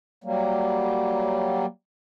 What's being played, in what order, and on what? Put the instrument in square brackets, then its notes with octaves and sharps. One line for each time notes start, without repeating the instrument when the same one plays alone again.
[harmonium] F#3 G3 A#3